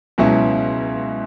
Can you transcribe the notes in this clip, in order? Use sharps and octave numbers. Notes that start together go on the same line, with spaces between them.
C#2 B2 F#3 C#4 E4